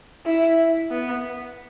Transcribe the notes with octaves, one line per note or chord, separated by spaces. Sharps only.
E4
B3